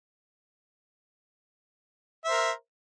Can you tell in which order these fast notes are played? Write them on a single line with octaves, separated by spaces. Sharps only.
E5 C5 A#4